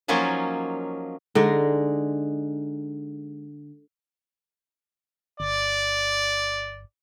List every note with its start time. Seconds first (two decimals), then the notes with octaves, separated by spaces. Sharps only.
0.08 F3 F#3 A#3 C#4 D#4 F4
1.35 D3 G#3 D#4 G#4
5.40 G1 D5